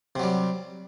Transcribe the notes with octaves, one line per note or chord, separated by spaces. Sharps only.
C3 F#3 G3